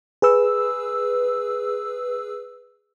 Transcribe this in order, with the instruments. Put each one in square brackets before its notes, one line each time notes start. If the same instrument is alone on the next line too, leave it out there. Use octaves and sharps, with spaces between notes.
[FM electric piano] G#4 B4 E6